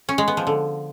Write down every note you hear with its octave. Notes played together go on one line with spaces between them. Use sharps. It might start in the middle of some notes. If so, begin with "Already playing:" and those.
C#4
G#3
B3
F3
D3